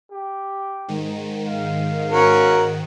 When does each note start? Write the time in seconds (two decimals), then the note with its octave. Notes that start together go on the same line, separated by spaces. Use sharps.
0.11 G4
0.88 G#2 D#3
1.47 F5
2.11 C#4 F#4 A#4